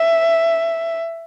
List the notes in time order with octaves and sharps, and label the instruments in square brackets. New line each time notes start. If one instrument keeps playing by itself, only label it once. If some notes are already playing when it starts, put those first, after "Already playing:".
Already playing: [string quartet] E5